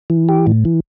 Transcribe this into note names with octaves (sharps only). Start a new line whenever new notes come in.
E3
G4
A2
E3